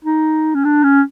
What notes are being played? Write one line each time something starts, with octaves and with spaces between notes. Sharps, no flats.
D#4
C#4
D4
C#4